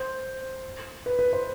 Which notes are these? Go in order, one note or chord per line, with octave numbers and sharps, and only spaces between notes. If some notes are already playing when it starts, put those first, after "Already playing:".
Already playing: C5
B4
B4
C5